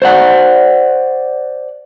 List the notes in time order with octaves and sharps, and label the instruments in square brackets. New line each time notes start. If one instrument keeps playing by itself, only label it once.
[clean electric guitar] C5 D5 F#5